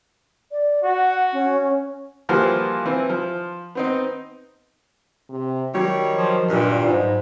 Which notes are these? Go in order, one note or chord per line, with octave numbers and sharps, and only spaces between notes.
D5
F#4 F#5
C#4
E3 F3 G3 A#3 F4 F#4
E3 C4
F3
B3 C4 D#4
C3
D#3 F#3 G3 C#5
F3
G2 A#2
G#2 D#4